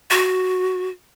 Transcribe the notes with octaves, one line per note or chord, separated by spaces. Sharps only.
F#4